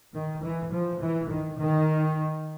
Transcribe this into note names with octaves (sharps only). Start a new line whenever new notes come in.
D#3
E3
F3
E3
D#3
D#3